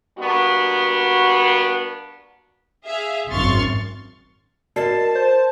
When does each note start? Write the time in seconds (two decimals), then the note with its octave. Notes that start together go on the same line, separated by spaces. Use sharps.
0.18 G3 A#3 B3 D4 F#4
2.86 G#4 E5 F5
3.30 G#1 F#2 C6 C#6 F6 A6
4.76 F#4 A#4 D5 D#5 A5 C7
5.15 C5